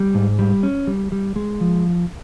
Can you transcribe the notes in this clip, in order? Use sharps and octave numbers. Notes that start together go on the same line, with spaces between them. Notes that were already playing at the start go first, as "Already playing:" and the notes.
Already playing: G3
G#2
G3
C#4
G3
G3
G#3
F3